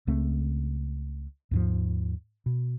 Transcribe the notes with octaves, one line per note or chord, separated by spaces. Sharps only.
C#2 C#3 A3 C4
D#2 G#2 F3
B2